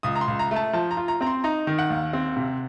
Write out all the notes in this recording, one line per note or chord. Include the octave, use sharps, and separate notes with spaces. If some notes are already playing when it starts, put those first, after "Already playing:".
C#2 D#6
A#5
C6
C#2
A#5
A3
A5
F3 A5
A#5
F4
A#5
C4 A#5
C6
D#4 A#5
D#3
F#5
D#2
C4
C3